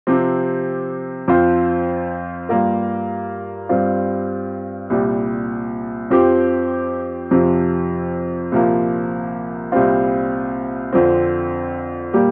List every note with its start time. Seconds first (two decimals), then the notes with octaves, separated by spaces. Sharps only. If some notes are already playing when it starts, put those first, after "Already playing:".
0.07 C3 F3 C4 G4
1.28 F2 F3 C4 F4 C5
2.49 G2 G3 A#3 F4 A#4
3.69 G2 G3 C4 F4
4.90 C2 A#2 G3
6.10 F2 F3 C4 G4
7.31 F2 C3 F3
8.52 C2 A#2 F3 A#3
9.72 C2 A#2 G3 C4 F4
10.93 F2 D3 F3 C4
12.13 A#2 G3 A#3 G4